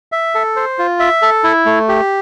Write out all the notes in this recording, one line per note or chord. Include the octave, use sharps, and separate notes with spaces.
E5
A4
C5
F4
E5
A4
E4
A3
G4